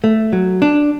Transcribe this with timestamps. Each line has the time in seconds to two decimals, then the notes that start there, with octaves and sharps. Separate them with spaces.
0.04 A3
0.33 F#3
0.62 D4